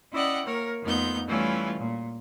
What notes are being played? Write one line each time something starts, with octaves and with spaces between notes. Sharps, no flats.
C#4 E4 D5 D#5 F#5 G5
A#3 A#4 C#5
F2 A3 B3 D#4 G6
E3 G3 A3 C#4 E4 F4
A#2